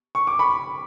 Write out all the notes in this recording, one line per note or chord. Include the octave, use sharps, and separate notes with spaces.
C#6
D6
B5 C#6